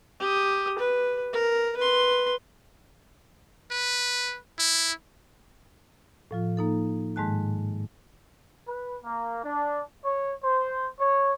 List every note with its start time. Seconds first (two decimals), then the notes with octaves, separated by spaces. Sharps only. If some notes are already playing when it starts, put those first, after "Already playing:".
0.20 G4 D#6
0.78 B4
1.33 A#4
1.77 B4 C6
3.71 B4
4.59 E4
6.31 A2 F3 F4
6.57 A#3 D#4 A4
7.16 G#2 D#3 G#3 A5 F#6
8.68 B4
9.02 A#3
9.43 D4
10.02 C#5
10.42 C5
10.98 C#5